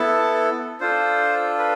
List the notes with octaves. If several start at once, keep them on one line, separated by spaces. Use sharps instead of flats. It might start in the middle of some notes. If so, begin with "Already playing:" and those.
Already playing: B3 E4 A4 A5
D4 F4 A4 C5
B4